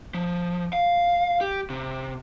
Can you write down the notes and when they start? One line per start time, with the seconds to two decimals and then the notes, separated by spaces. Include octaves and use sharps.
0.14 F3
0.73 F5
1.41 G4
1.70 C3